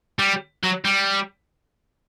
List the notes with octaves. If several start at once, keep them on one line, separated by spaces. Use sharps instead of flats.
G3
F#3
G3